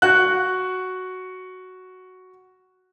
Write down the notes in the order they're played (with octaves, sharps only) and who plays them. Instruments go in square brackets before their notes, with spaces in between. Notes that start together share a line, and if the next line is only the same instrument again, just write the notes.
[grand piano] F#4 F#6